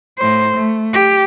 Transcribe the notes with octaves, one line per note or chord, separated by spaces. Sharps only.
A2 C5
A3
G4